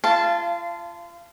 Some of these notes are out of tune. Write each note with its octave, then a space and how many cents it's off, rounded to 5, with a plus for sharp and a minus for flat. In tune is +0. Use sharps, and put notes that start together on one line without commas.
F4 -35 F5 -20 A5 +0